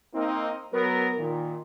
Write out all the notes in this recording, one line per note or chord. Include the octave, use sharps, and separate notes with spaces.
A#3 C4 D#4
F#3 B3 A#4
A#2 D#3